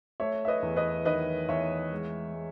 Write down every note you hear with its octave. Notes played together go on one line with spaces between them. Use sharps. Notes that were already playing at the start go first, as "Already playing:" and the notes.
A3 C#5 E5
E5
B4 D#5
E2
B4 D#5
D#3 B4 D#5
E2 C#5 E5
G#3
G#3